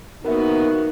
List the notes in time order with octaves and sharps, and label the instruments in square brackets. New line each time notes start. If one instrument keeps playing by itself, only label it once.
[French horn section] C#3 A#3 B3 [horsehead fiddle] D#4 F#4 [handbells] A#4 E5